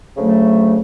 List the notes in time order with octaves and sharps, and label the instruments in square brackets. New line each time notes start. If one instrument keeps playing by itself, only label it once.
[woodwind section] D2 C#3 F#3 A3